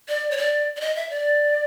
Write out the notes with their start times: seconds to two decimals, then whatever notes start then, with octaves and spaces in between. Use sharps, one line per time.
0.08 D5
0.31 C#5
0.38 D5
0.77 D5
0.81 D#5
0.96 E5
1.10 D5